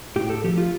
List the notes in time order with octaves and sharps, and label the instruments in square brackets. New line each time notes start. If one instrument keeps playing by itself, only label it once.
[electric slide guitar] A2 G4
A4
F3 G4
F4